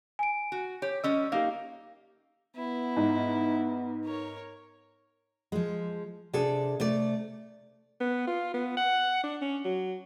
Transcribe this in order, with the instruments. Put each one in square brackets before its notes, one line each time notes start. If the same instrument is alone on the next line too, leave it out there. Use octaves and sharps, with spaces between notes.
[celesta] G#5 D7
[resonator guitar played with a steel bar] F#4
[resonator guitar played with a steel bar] G4 [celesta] C#5
[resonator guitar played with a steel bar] G3 C#4 D#5 [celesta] E6
[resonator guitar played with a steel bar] A#3 D#4 [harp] G4 F5
[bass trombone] B3 [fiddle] E4
[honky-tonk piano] G#2
[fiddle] A#4 C#5
[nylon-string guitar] F3 G#3
C3 D4 G#4 A4
C3 A3 D5
[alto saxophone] B3
F4
B3
F#5
D4
C#4
F#3